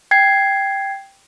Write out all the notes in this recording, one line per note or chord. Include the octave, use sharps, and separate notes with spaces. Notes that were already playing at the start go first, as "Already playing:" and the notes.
G5 G#6 C7